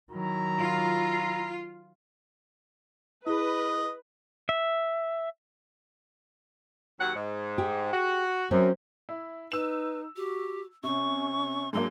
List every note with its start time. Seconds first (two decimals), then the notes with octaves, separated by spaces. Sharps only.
0.11 D#3 F#3 E4 A#5
0.59 F4
3.27 E4 G#4 B4 D#5
4.49 E5
7.00 D#2 F#3 F#5
7.15 G#2
7.58 G4 G#4
7.92 F#4
8.51 F#2 F#3 C4 C#4
9.09 E4
9.52 D#4 B4 E6 E7
10.16 F#4 G4
10.84 C3 C#4 C#6
11.73 G#2 F#3 A#3 D4 C6